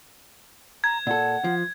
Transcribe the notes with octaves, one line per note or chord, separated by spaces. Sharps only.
A#5 G#6
A#2 A4 F#5
F3